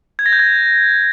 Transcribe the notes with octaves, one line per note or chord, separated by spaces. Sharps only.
G#6
A#6
G6
G#6